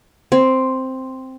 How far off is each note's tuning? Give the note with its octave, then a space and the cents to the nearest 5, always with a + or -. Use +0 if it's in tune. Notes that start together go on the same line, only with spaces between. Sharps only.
C4 +0